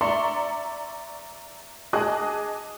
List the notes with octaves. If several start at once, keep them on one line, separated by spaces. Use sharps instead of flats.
D5 E5 A#5 C6 C#6
G#4 D#5 A5 D6 D#6 F#6